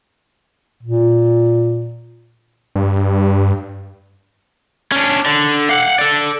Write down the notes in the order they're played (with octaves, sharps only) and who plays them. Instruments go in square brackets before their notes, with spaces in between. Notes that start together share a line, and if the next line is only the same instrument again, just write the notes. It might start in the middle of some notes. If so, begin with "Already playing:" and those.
[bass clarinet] A#2
[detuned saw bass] G2
[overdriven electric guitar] C#4 D4
D3
F5 F#5
A4 D5